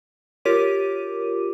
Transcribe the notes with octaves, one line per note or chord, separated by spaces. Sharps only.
F4 G4 A#4 C#5 D6 D#7